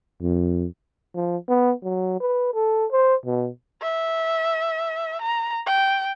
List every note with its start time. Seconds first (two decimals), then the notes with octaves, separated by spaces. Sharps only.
0.22 F2
1.15 F3
1.49 B3
1.83 F#3
2.20 B4
2.54 A4
2.92 C5
3.26 B2
3.82 E5
5.21 A#5
5.66 G5